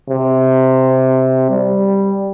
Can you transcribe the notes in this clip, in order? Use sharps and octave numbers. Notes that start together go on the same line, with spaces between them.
C3
G3